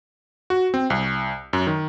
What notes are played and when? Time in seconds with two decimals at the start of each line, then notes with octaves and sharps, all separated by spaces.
0.50 F#4
0.74 C4
0.90 C2
1.53 F#2
1.67 D#3